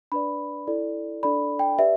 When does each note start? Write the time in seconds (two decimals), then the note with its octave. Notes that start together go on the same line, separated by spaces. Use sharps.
0.12 D4 B4 D5 B5
0.67 E4 A4 D5
1.23 D4 A4 D5 B5
1.59 G5
1.78 G4 B4 D5 E5